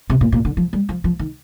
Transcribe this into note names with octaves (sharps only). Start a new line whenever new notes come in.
C3
A#2
A#2
D3
F3
G3
F3
F3
D#3